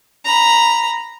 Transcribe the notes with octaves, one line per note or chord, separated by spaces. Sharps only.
A#5 B5